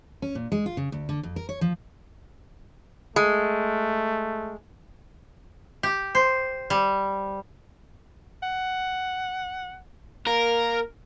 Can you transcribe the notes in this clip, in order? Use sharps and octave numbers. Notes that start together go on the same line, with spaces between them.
C#4
A#2
G#3
F4
C#3
D2
D3
F2
A#4
C#5
F3
G#3 A3
G4
C5
G3
F#5
A#3 A#4